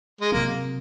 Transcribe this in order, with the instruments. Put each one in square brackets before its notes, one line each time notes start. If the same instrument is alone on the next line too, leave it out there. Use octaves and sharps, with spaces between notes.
[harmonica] G#3
[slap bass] C3 F#3 C4 [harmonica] A#3